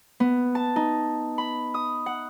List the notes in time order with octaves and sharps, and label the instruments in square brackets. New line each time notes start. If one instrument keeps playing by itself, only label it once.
[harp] B3
A5
D#4
B5
D#6
F#5